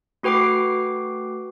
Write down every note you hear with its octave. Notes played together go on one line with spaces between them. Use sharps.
A3 F#4 B4 G5 D6 C7